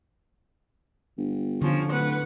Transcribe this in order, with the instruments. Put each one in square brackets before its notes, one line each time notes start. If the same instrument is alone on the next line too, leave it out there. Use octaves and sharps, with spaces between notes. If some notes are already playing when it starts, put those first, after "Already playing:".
[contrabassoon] G1
[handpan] D3 [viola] F3 C#4
[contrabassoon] D1 [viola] B4 F#5